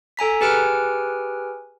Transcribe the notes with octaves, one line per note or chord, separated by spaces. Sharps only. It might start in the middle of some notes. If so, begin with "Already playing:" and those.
A4 G#5 A#5 B6
G4 G#4 B4 G#5 F6 D7